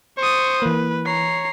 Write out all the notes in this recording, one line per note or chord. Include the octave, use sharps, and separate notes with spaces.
C5 C#6 D#6
E3 A#3 B4
C#5 A#5 C7